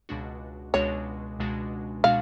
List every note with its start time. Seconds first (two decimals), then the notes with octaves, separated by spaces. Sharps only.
0.09 C#2 B2 G#3 D4 F#4
0.74 C#2 B2 G#3 D4 F#4 C#5
1.39 C#2 B2 G#3 D4 F#4
2.04 B2 G#3 D4 F#4 F5